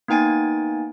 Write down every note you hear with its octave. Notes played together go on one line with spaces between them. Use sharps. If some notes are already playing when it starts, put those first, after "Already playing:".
A#3 B3 D#4 G5 G#5 A6